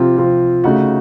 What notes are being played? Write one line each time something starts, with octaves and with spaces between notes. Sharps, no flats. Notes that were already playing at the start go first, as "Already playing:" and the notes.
Already playing: C3 F3 C4 F4
C3 F3 C4 F4
C#3 A3 D#4 F#4